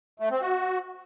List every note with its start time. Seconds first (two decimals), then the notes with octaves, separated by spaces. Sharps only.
0.20 A3
0.31 C4
0.42 F#4